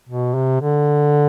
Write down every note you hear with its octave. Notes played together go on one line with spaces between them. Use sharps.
B2
C3
D3